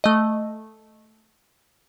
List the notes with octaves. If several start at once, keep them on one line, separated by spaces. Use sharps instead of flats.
A3 D#5